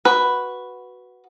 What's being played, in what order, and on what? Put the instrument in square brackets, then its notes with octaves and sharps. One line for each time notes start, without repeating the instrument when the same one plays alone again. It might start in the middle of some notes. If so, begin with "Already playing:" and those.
[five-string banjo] F#4 B4